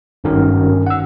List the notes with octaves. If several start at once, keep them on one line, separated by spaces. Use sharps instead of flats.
G#1 G2 D#3 C#4 F#4 A#4
F#5 E6